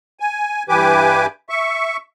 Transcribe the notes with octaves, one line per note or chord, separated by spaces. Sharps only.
G#5
G2 E3 G4 B4 G#5 D6
E5 C#6